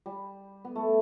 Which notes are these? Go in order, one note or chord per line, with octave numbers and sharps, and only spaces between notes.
G3
B3
A3